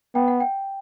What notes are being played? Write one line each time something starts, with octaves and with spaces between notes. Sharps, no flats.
B3 G5
F#5
G5